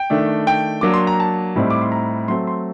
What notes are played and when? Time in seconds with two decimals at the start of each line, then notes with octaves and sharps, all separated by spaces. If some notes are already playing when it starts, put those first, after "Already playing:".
Already playing: G5
0.10 D#3 A3 D4
0.47 G5
0.81 F#3 A#3 D4 D6
0.94 C6
1.07 A#5
1.20 A5
1.56 A2 G3 C4 D#4
1.70 D6
1.81 C6
1.92 A#5
2.28 F#3 A3 C4 C6
2.47 C6